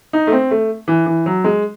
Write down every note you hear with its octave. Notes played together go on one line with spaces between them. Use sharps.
D#4
A3
C4
A3
E3
E3
F#3
G#3